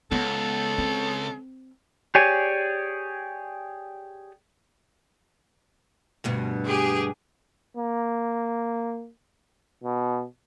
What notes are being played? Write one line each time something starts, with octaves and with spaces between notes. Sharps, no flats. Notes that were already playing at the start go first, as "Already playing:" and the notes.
C#2 B3 A4
C4
G4 G#4 C#5 D5 G#5
D2 G2 B2
G4 G#4
A#3
B2